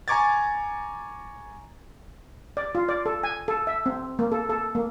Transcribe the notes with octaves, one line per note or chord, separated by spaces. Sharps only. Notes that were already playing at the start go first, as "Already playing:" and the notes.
G#5 A#5 C#6 D6 G#6 A6
D5
F4
D5
A4
G#5
A4
E5
C4
A#3
A4
A4
A#3